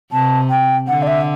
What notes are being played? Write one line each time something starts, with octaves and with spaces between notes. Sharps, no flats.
C3 A5
G5
D3 F#5
D5
E5